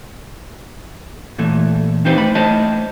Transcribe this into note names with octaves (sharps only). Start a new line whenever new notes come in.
A#2 E3 A3
E3 C4 D#4 G4 B4 C5
A3 B5
A3 E4 C5 C#5 D#5 A5